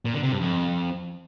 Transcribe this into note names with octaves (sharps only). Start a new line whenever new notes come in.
A#2
D3
C3
G2
F2